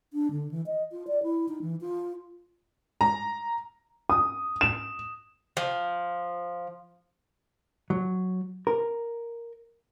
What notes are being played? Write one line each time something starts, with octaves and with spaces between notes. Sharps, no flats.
D4
D3
E3
D#5
F4
D5
E4
D#4
E3
F4
A#5
D#6
E7
F3
F#3
A#4